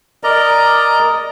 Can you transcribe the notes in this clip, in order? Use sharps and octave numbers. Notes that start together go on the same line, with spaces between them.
A#4 D5 D#5 A#5